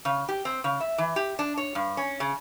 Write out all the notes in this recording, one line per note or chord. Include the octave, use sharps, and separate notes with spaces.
C#3
G4
C4
C#3
E5
E3
G4
D4
C#5
G2
C#4
C#3